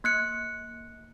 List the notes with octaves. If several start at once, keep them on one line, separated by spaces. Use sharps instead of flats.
A#3 F#6 C#7